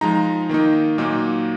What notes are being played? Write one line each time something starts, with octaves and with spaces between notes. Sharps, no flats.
F3 G#3 D#4 A#5
D#3 A#3 D#4
A#2 F#3 A#3 D#4